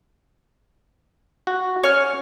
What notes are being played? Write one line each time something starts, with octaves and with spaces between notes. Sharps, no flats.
F#4
C#4 C#5 F6